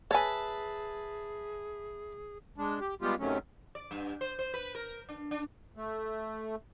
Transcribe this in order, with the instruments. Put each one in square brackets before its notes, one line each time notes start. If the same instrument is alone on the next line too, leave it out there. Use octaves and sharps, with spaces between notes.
[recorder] G#4 [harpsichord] B4 E5 A5 [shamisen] C#5 G#5
[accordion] G#3 D4
G4
G3 G#3 B3 F4 G4
F#2 C3 D#3 F#3 A3 C#4
[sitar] D5
G2
C5
C5
B4
A#4
D4
D4
[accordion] A3